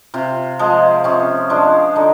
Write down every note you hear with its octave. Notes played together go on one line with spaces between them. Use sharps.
C3 F4
F3 G#3
C3 C#4
F3 G#3 D4
D3 D#4